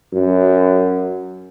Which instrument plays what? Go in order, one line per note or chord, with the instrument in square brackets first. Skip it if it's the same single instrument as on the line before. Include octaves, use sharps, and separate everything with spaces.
[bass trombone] F#2